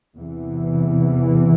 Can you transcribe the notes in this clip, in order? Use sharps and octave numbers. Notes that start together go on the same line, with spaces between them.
E2 C3 E3